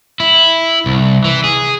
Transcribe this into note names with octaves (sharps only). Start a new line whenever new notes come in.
E4
C2
E3
G#4